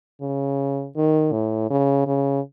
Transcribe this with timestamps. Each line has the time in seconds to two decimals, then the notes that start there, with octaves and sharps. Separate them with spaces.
0.21 C#3
0.96 D#3
1.32 A2
1.70 C#3
2.07 C#3